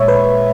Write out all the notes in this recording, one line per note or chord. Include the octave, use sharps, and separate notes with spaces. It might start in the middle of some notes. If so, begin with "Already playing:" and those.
Already playing: A#2 G#3 C#5 E5
B4